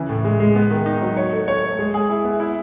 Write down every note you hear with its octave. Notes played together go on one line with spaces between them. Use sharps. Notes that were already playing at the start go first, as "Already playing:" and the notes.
Already playing: C#3 E3
A2
G#3
G#3
B3
D#3
D#4
F#3
C#5
A3
C#5
A3
G#3
G#4
E4
B3
E4